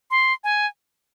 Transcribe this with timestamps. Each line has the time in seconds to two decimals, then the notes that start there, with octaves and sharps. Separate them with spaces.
0.11 C6
0.44 G#5